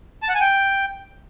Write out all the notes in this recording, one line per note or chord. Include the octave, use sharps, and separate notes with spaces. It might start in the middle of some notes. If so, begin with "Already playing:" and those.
A5
F#5
G#5
G5